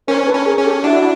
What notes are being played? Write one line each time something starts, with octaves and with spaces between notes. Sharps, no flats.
C#4 A#4 C5
A4 B4
C#4
G#4 A#4
C#4
G4 A4
D4 E4 F#4